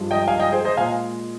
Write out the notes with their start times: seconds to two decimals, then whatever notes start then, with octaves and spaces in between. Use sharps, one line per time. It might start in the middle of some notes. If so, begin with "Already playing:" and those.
Already playing: G2 F3 G#3
0.11 D#5 G5
0.28 F5 G#5
0.40 D#5 G5
0.52 G#4 C5
0.65 C5 D#5
0.77 A#2 G#3 F5 G#5